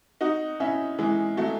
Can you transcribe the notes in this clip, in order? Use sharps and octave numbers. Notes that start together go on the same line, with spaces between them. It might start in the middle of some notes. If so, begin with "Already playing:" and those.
D#4 F#4
C#4 E4
E3 G#3
F#3 A3